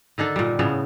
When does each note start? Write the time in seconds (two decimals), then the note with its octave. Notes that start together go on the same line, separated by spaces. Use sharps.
0.18 D3 D#3 D4 A4
0.36 A#2 G3
0.59 A2 C#3 B3